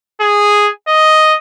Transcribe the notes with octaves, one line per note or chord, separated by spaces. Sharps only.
G#4
D#5